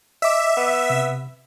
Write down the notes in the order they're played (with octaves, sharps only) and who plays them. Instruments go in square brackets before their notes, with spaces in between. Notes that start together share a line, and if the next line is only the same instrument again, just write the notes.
[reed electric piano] D#5 D6 [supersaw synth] E5
[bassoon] B3
[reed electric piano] C3